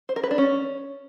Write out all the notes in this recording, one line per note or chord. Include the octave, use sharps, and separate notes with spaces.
C5
A#4
B4
D4
C#4